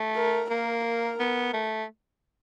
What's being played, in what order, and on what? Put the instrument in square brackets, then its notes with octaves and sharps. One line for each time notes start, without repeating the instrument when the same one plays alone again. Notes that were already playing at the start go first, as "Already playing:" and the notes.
Already playing: [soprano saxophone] A3
[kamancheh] A#4
[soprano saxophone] A#3 [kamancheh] A#4
[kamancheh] A#4
[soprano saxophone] B3
A3